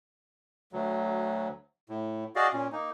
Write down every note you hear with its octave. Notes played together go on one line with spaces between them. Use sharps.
D2 F#3
A2
F#4 G#4 D5 D#5 F5
A#2 C#4
A#3 D#4